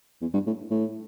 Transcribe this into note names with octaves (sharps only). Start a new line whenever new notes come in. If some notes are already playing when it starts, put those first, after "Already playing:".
E2
G2
A2
A2